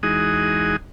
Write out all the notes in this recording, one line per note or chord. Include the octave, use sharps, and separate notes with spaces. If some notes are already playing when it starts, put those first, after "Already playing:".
E2 G#3 D#4 F#4 G#4 D#6